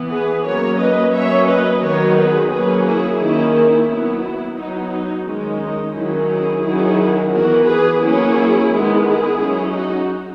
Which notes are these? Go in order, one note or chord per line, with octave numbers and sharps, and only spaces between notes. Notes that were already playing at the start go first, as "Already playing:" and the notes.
Already playing: E3 B3
G#4 B4
F#3 A#3 C#4 A#4 C#5
B4 D#5
F#3 A#3 C#4 C#5 E5
B4 D#5
D#3 F#3 B3 A#4 C#5
G#4 B4
F#3 A#3 C#4 G#4 B4
E4 G#4
D#3 A#3 C#4 E4
E4
F#3 B3
E4
F#3 B3 D#4
D#4
D#3 G#3 C#4
D#4
D#3 F#3 C#4 E4
E4 G#4
D#3 F#3 C#4 E4 G#4
E3 B3 F#4 A#4
G#4 B4
F#3 A#3 C#4 E4 G#4
D#3 G#3 B3
E4 G#4
F#3 C#4
D#4 F#4